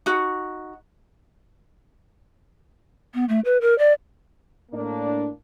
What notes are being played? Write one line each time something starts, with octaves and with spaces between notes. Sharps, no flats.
D#4 F#4
B3
A3
B4
A#4
D5
A2 A#3 D4